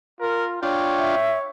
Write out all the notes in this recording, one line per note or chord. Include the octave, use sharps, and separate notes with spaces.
F4 A#4
D4 F4 C#5 G5
E5